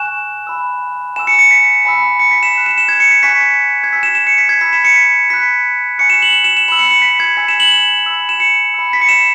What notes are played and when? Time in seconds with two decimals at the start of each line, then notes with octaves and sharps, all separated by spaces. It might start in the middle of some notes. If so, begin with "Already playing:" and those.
Already playing: G#5 C#6 F#6 E7
0.47 B5 E6
1.16 G#5 C#6 E6 E7
1.27 C#7
1.39 C#7
1.51 B6
1.85 G#5 B5 E6
2.20 C#7
2.31 B6
2.43 E7
2.54 B5 F#6
2.66 E7
2.78 E7
2.89 G#6
3.00 C#7
3.11 B6
3.22 G#5 C#6 F#6 B6
3.41 B6
3.84 G#6
3.93 E6 B6
3.96 G#5
4.03 E7
4.15 E7
4.27 C#7
4.38 B6
4.49 G#6
4.61 B5 E6 B6
4.73 E7
4.85 C#7
4.96 B6
5.30 B5 F#6 B6
5.98 G#5 C#6 F#6 C#7
6.10 E7
6.22 F#7
6.33 E7
6.44 E7
6.57 E7
6.68 B5 E6 F#7
6.79 C#7
6.90 C#7
7.02 B6
7.20 G#6
7.37 G#5 E6 B6
7.49 E7
7.60 F#7
7.71 E7
8.06 B5 E6
8.29 E7
8.40 C#7
8.74 B5 E6
8.93 B6
9.01 C#7
9.09 E7